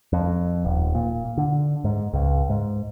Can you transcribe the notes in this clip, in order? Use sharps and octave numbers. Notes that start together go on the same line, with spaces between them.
F2
D#1
A#2
D3
G#2
C#2
G#2